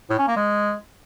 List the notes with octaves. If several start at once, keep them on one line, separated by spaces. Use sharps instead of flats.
A2
C#4
A#3
G#3